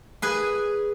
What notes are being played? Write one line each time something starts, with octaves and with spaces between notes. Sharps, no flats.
G#4 B4 G#5